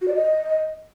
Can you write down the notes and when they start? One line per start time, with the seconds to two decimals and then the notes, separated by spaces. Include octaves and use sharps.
0.01 F#4
0.08 D5
0.14 D#5